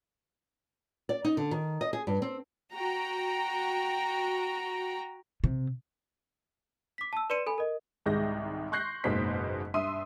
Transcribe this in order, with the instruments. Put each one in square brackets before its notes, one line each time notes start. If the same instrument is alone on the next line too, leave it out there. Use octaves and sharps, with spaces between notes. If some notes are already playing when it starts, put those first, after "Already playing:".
[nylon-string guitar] D5
D#4
D3
D#3
D#5
G#4
G2
C4
[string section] F#4 G5 A#5
[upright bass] C3
[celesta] D6 B6
A5 E6
B4 D5 C6 C#7 D#7 E7
A4 G#5 B5
A#4 D#5
[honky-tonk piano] C2 G#2 D#3 G#3 G6 A#6
C6 C#6 F#6 G6 A#6 C7
F#1 G#2 B2 A#3 C5 B6
G2 E5 C6 D#6 E6 D#7